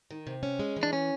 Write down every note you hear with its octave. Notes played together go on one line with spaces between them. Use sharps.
D#3
C3
C#4
G#3
E3
D4
C#4